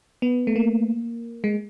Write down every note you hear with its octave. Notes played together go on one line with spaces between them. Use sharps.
B3
A3
A#3
G#3